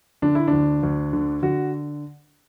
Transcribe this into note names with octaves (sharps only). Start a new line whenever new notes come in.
D3 D4
E4
D4
D2
D2
D3
D3 F#4